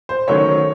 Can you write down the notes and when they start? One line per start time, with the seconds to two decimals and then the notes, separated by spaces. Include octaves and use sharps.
0.09 C5
0.27 D#3 F#3 A3 C#4 C#5